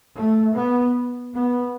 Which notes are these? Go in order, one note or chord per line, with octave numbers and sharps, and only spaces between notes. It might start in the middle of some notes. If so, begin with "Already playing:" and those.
A3
B3
B3